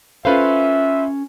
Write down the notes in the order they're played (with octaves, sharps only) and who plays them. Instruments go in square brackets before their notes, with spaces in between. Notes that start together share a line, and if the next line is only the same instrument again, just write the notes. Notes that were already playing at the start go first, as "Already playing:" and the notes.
[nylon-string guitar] C#4 A4 F5 [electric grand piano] F4 B4 C5 [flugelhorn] E5